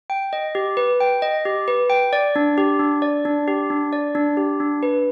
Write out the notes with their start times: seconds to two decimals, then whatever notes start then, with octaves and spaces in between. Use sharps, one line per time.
0.10 G5
0.33 D#5
0.55 G4
0.77 B4
1.00 G5
1.22 D#5
1.45 G4
1.68 B4
1.90 G5
2.13 D5
2.36 D4
2.58 G4
2.79 D4
3.02 D5
3.25 D4
3.48 G4
3.70 D4
3.93 D5
4.15 D4
4.37 G4
4.60 D4
4.83 B4